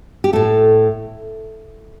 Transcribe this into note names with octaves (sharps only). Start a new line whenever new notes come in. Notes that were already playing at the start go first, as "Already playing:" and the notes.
G4
A2 A3 A4